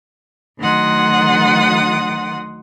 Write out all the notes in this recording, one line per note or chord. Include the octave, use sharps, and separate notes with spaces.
D2 D#3 F#3 F#5 C6 D#6